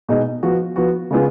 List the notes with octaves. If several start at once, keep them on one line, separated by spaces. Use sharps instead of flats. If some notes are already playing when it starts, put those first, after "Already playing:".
B2 G#3 D#4
F3 B3 F#4
F3 B3 F#4
C#3 G#3 B3 F4 G#4